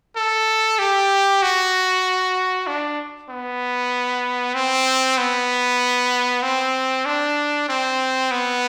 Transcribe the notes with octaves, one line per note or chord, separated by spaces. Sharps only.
A4
G4
F#4
D4
B3
C4
B3
C4
D4
C4
B3